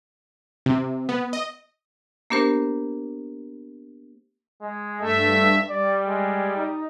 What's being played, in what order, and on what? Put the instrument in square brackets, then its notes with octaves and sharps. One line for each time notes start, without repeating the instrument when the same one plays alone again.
[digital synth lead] C3
B3
D#5
[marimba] A#3 B3 D4 G4 A#4 C5
[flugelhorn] G#3
[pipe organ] G2 E5 [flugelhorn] A3
[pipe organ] G3 [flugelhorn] D5
[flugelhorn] G#3
D#4